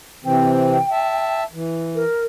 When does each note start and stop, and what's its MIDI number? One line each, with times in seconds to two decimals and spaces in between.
0.24 0.77 48
0.24 0.77 52
0.24 0.77 60
0.24 1.39 79
0.92 1.44 76
0.92 1.44 81
1.53 2.04 52
1.95 2.26 70